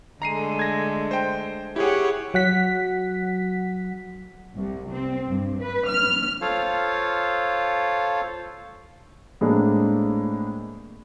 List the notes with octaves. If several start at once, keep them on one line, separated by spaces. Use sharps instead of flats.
D3 G#3 A3 A#5 C7 D#7
G#6 A#6
C5 G5
E4 G4 G#4 C#5 F#5
F#3 F#5 B6
C2
C4
G2
B4
F6
F4 A4 C5 C#5 F5
A2 G#3 A#3 C4 D4